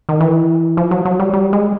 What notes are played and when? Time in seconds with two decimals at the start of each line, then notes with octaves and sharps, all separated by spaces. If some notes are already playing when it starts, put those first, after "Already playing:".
0.09 D#3
0.21 E3
0.77 F3
0.91 F#3
1.05 F#3
1.20 G3
1.33 G3
1.53 G#3